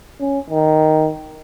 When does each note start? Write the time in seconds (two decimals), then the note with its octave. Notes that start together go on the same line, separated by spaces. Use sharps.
0.20 C#4
0.50 D#3